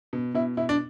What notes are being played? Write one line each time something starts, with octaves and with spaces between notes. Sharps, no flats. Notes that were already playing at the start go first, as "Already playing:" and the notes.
B2
B2 E4
B2 E4
D4